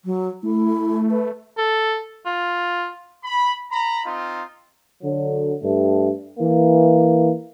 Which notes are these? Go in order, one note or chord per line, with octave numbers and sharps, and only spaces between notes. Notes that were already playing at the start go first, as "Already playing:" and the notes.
F#3
A3 E4
B4
A4
F4
B5
A#5 B5
C4 D#4 F4
D3 F#3
G2 A3
E3 A#3